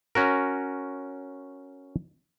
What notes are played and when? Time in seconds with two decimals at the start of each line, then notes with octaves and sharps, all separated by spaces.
0.15 C#4 F#4 A#4